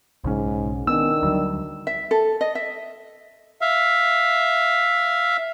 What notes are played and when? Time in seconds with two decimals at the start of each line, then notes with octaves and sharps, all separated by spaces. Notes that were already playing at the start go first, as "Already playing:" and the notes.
0.24 B1 G#2 C#3 C#4
0.87 D#3 B3 C#4 D4 E6
1.23 D2 F#3 G3
1.87 E5
2.11 A4
2.41 D#5
2.55 E5
3.61 E5 F5